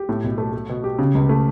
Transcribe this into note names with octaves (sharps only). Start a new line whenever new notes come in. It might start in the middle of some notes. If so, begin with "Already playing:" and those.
Already playing: G4
A2
B1
A3
A3
B2
G4
C#3
C#2
A3